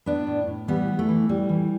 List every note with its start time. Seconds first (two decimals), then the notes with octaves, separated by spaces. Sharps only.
0.06 A2 B3 D4
0.27 A2
0.47 A2
0.68 E3 G3 B3
0.88 E3
0.99 A3
1.09 E3
1.29 A2 G3
1.49 E3